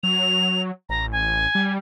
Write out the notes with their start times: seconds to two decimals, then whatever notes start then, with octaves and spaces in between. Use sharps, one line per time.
0.03 F#3 F7
0.89 A1 A#5
1.12 G#5
1.55 G3